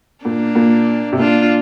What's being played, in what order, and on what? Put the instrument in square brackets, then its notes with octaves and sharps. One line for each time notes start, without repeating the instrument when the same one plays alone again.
[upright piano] A#2 [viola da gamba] A#3 D4
[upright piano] A#2
C3
[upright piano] A#2 [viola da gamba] D4 F4